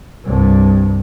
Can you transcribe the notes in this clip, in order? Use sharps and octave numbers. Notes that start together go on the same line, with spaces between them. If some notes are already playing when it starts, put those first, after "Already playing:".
C2 G2